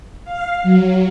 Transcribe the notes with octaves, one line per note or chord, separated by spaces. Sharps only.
F5
F#3